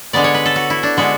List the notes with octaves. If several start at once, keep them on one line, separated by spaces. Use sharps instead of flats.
D3 G#3 B3 D5
C#5
B4
A4
F#4
E4
D4
D3 G#3 B3 F#4